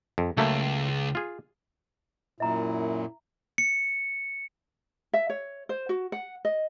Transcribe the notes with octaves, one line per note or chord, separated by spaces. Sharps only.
F2
C#2 F#3 A3 A#3
F4 G#4
F#2 A#2 E4 E5 A#5
C#7
E5
C#5
C5
F#4
F#5
D#5